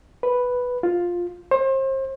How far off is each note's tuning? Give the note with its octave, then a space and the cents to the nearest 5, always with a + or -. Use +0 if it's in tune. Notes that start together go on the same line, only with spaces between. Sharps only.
B4 +0
F4 +5
C5 +35